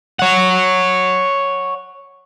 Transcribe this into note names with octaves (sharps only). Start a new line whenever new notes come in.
C#5 F#5